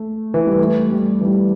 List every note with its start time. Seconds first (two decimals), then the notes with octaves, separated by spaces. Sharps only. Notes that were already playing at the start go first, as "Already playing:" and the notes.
Already playing: A3
0.34 E3
0.47 G3
0.58 A3
0.92 G3
1.21 E3
1.25 G3